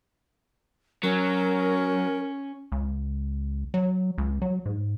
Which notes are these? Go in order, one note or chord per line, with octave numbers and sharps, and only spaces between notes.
F#3 C#4 A#4
C#2
F#3
C#2
F#3
G#2